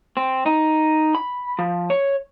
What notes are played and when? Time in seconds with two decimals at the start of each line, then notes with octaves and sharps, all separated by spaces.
0.17 C4
0.46 D#4
1.15 B5
1.59 F3
1.90 C#5